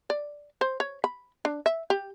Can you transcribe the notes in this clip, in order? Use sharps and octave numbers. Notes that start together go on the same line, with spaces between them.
D5
C5
C#5
B5
D4
E5
G4